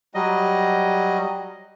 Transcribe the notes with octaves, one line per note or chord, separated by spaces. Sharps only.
F#3 G3 D#5